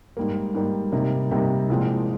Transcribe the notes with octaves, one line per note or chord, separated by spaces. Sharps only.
G#2 G3 A#3
G#2 G3 A#3
C3 G3 A#3 D#4
C3 G3 A#3 D#4
C2 A#2 F3 G#3 C4